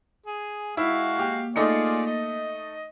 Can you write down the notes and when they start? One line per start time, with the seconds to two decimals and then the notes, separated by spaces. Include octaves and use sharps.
0.26 G#4
0.77 G#3 E4 F#4 F5
1.19 A#3 G4
1.56 A3 D#4 F4 G#4 D5 C#7
2.07 D#5